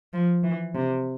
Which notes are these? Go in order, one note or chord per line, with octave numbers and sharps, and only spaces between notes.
F3
E3
C3